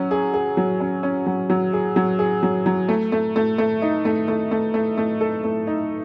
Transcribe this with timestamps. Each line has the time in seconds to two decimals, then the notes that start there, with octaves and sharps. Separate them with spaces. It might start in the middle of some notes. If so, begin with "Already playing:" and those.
Already playing: F#3 C#4
0.11 G#4
0.34 G#4
0.57 F#3
0.80 C#4
1.03 C#4
1.26 F#3
1.50 F#3
1.73 G#4
1.96 F#3
2.19 G#4
2.43 F#3
2.66 F#3
2.89 A3
3.12 A3
3.36 A3
3.58 A3
3.82 D#4
4.05 A3
4.28 A3
4.51 A3
4.74 A3
4.98 A3
5.21 A4
5.44 A3
5.67 D#4